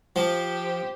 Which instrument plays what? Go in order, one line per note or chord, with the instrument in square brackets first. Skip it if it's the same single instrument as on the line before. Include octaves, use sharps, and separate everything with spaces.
[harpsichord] F3 [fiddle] G4 C5